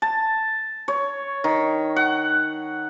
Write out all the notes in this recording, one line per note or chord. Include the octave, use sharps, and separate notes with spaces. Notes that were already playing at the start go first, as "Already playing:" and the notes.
A5
C#5
D#3
F#5